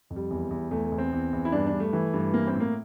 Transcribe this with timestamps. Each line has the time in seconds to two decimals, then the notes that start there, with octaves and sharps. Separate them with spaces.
0.10 F2
0.16 G3
0.30 E2
0.50 E2
0.71 E2 A3
0.85 A3
0.92 E2
0.98 C4
1.12 E2
1.33 E2
1.45 E4
1.52 G2 D4
1.67 D4
1.73 G2
1.80 A3
1.93 E3
2.13 G2
2.34 E3 A#3
2.47 C4
2.54 A2
2.60 A#3